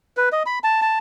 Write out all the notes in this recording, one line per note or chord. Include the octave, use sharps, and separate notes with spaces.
B4
D#5
B5
A5
A5